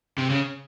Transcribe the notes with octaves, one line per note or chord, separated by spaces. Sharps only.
C3
C#3